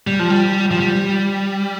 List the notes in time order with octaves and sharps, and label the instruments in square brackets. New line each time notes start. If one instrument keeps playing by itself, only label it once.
[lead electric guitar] G3
F3
G3
F3
G3